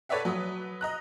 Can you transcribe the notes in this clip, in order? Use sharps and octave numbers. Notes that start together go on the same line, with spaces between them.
A4 B4 C#5 D5 E5 F#5
F#3 B4 D#6
D#5 A#5 F#6